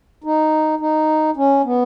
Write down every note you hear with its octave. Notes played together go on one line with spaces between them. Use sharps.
D#4
D#4
C#4
B3